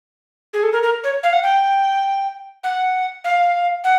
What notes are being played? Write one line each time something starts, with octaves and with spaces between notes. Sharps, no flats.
G#4
A4
A#4
A#4
C#5
F5
F#5
G5
F#5
F5
F#5